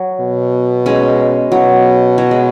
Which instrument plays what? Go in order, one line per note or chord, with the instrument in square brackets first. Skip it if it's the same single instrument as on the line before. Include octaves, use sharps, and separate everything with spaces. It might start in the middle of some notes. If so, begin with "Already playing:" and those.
Already playing: [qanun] F#3
[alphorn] B2
[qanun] G#3 C#4
[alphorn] B2 [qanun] F#3
[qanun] F#3
G#3